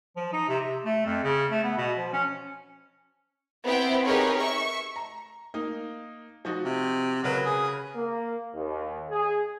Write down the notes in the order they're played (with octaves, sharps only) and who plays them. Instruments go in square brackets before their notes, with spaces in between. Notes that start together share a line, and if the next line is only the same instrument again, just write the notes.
[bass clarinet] F3
D#4
C3
C3
A3
F2
C#3
A3
B3
B2
F3
C#4
[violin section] B3 C4 E4 G5
D#4 G4 G#4 A#4 B4 C#5
E5 C#6
[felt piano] A#5
A#3 D#4
F3 D#4 F#4
[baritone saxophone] C3
[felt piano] C#3 A#4 B4 [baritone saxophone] F#3
[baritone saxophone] G#4
[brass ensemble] A#3
D#2
G#4